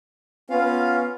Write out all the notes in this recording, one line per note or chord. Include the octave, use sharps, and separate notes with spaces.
B3 C#4 F4 F5